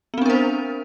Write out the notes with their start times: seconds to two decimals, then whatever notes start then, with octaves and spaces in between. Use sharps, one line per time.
0.14 B3
0.18 C4
0.22 D4
0.26 A#4
0.30 C5